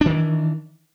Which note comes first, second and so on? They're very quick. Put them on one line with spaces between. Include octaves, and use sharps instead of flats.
D4 D#3 E3